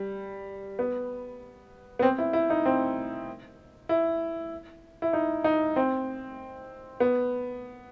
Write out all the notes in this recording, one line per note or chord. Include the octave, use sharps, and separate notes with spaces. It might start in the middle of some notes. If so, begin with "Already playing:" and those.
Already playing: G3
B3
B3
C4
E4
E4
D#4
C4
E4
E4
D#4
D#4
C4
B3